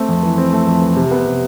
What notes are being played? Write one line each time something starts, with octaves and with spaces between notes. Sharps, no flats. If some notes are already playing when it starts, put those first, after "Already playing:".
Already playing: A3 C4
F2
E3
C4
A3
F2
E3
C3
B3
C3